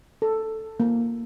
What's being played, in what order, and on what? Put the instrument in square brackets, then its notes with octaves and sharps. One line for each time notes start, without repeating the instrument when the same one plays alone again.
[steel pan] A4
A#3